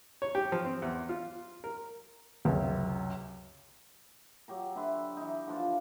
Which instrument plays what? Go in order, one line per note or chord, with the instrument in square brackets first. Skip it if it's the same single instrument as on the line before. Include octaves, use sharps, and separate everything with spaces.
[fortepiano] C#5
G4
F3
C4
E2
F4
A#4
[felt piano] C#2 F#2 C3
[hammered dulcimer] F#3 G4 A#4
D3 B4 E5 C6
E3 D#4
D3 F3 F4 C5